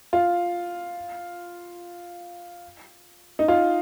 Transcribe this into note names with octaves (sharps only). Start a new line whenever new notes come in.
F4
D#4
F4